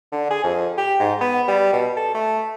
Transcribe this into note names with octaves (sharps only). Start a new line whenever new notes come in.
D3
G#4
F2
G4
G#2
B3
G3
B2
A4
A3